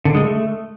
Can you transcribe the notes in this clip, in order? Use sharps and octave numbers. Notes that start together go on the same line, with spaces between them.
D3
G#3
A3